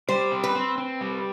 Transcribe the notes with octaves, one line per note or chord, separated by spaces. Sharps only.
G3 C5
C4
B4
C4
C4
G3